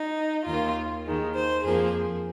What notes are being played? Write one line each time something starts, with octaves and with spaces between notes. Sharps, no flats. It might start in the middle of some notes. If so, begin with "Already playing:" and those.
Already playing: D#4
D#2 D#3 A#3 F4
D#2 D#3 G#3
C5
F2 F3 A#3 G#4